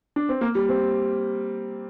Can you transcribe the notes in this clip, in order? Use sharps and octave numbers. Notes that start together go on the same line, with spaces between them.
D4
C4
A#3
G3
C4